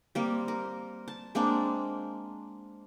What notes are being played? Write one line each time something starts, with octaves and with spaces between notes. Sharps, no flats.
G3 A#3 C4
A#4
A5
G#3 A#3 C4 D4